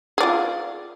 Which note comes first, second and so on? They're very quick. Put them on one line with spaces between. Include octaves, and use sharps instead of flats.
G#4 D5 F4